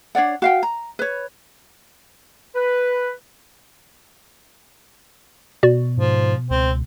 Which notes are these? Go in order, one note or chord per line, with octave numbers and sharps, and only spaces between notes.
D4 C#5 D5 F#5
F#4 F5 G5
A#5
B4 C#5
B4
B2 F#4 D5
G#2 F3
C#2 C4